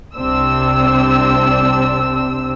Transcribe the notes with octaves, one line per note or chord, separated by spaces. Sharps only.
C2 C3 C4 D4 E6